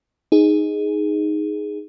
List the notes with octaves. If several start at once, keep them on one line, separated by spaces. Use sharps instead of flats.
D#4 G#4